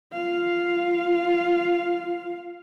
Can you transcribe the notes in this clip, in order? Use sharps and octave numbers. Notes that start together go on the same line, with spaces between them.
F4 F5